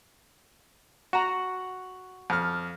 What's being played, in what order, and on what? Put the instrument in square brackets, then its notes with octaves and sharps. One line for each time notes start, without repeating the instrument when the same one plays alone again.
[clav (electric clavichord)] F#4 [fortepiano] F#5 A#5
[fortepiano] F2 F6